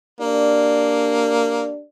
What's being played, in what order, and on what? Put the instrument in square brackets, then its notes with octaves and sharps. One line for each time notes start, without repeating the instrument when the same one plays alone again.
[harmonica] A#3 [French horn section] D4 G4 D5